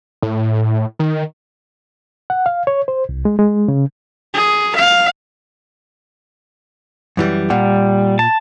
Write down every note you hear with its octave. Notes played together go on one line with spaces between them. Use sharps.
A2
D#3
F#5
F5
C#5
C5
C2
G#3
G#3
C#3
G#4
F5
F#2 E3 G3
A#2 G3 F#5
A5